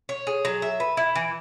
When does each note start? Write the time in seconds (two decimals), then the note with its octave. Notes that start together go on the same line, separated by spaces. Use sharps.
0.09 C#5
0.27 G#4
0.45 F#3
0.62 E5
0.80 B4
0.97 E4
1.15 E3